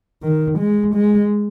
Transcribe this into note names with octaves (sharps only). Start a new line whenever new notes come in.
D#3
G#3
G#3